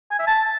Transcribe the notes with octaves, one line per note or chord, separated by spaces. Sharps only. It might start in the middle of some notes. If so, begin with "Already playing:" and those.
G#5
E5
A5